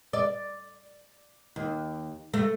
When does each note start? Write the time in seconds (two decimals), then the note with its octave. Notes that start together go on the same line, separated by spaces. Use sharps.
0.13 D5
1.56 D#2
2.33 A3